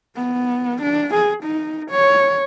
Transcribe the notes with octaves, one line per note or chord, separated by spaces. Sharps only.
B3
D4
G#4
D#4
C#5